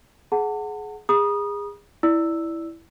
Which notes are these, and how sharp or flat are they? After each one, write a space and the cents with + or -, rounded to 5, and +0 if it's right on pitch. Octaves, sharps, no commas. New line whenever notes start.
G#4 +25 F#5 +0 A5 +40
G#4 -25 B5 -45 D#6 -15
E4 +0 D5 +0 E6 +0